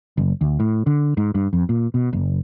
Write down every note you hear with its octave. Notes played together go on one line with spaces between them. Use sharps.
F#1
D2
A2
D3
G#2
G2
F2
A#2
B2
F#1